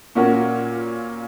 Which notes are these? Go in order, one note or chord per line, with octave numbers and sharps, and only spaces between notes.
A#2 A#3 C#4 F#4 A#4